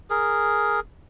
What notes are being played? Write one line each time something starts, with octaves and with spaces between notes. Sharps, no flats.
G#4 A#4